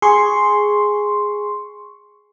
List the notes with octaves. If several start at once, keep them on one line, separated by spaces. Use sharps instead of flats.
G#4 C6 C#6